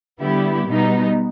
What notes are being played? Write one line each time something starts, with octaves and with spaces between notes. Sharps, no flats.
D3 G3 B3 E4 G4
B2 G3 B3 D#4